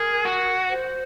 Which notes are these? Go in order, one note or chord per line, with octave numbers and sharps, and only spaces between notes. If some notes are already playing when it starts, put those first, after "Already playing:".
Already playing: G#4 A#4
F#4
C5